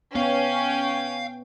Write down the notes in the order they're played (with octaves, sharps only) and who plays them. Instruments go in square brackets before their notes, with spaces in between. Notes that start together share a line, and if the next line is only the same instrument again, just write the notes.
[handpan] B3 [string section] C#4 [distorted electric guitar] F5 [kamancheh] G5